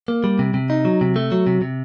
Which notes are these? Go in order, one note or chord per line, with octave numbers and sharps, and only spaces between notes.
A#3
G3
C3
C3
D#4
F#3
C3
A3
F#3
C3
C3